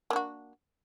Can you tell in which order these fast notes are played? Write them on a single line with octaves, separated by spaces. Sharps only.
A#3 D4 F#4